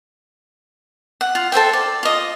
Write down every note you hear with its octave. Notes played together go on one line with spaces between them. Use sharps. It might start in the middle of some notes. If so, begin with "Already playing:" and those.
F#5
F4
A4 C5 E5 G5
D5
F4 D#5